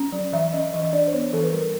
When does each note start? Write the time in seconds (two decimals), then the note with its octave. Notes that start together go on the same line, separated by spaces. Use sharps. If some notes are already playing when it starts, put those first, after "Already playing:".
Already playing: C#4
0.12 F#3
0.32 E3 E5
0.53 C#4 D#5
0.73 E3 D#5
0.83 D#5
0.93 D4 D5
1.08 C5
1.13 B3 C#5
1.33 E3 A4
1.43 B4
1.53 G3 A#4